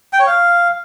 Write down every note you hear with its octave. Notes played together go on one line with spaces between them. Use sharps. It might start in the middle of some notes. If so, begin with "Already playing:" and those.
G5
C#5
F5